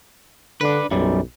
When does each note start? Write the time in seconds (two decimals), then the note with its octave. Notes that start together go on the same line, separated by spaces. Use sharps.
0.61 D3 D4 B4
0.91 B1 F#2 G3